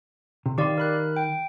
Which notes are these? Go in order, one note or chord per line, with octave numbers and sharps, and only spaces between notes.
C3
D#3 G4 D5 F5 C6
A#4 B5 F#6
G5